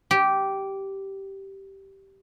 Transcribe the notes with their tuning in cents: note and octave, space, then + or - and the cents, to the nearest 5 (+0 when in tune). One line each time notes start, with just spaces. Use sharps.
G4 -10